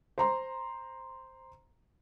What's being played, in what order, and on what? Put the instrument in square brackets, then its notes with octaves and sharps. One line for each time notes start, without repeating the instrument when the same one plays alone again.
[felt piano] C5 A#5 C6